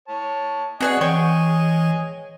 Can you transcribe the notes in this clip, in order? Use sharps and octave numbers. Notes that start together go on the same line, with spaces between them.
C#5 A5
C4 F#4 G#4 B4 D5 D#5 F#5 G#5
E3 C#5 G5 C#6